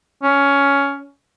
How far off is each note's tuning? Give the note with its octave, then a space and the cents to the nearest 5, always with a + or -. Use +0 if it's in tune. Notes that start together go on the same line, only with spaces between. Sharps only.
C#4 +10